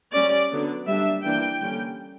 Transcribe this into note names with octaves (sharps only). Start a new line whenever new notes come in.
G3 C#4 D5
D3 F#3 B3
G3 A#3 D4 E5
E3 A#3 D4 G5
D3 G3 A#3 C#4